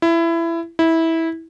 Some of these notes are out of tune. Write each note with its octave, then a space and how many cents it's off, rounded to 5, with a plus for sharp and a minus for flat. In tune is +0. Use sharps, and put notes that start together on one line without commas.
E4 +20
E4 -15